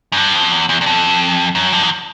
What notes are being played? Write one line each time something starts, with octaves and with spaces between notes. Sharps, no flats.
F#2
G2
F2
E2
E2
E2
F2
F#2
G2
E2